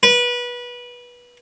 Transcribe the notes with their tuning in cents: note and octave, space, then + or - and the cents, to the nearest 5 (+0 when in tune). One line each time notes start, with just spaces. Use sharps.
B4 -25